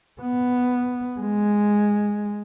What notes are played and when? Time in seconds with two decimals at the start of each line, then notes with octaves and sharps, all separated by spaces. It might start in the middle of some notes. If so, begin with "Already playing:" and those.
0.21 B3
1.19 G#3